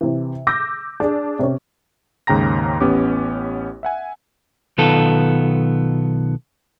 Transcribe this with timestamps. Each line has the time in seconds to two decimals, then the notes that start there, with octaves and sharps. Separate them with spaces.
0.01 C3 E3
0.47 D6 E6 G6 A#6
1.00 D4 G#4
1.39 C3 C#4
2.27 D#2 G#2 C#3 G5 A#5 A#6
2.81 A1 B3 C#4 G4 D6
3.83 E5 F#5 G#5
4.78 B1 D#3 B3 F4 A4